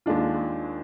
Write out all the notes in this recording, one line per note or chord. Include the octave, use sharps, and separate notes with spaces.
D#2 D#3 G#3 D4 F4